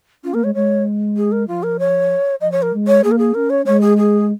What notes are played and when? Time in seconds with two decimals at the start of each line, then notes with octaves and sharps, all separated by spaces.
0.23 C#4 F4
0.34 A#3 A#4
0.44 G#3 C#5
0.54 G#3 C#5
1.17 G#4
1.32 A#4
1.48 F3 F4
1.63 A#4
1.79 C#5
2.41 F3 D#5
2.52 C#5
2.62 A#4
2.73 G#3
2.87 C#5
3.04 A#3 G#4
3.11 A#4
3.19 G#4
3.34 C#4 A#4
3.50 C#5
3.66 G#3 C#5
3.81 G#4
3.98 G#4